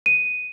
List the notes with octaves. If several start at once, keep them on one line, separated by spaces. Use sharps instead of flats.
D#7